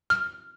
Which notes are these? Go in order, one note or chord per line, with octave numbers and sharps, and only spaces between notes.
F6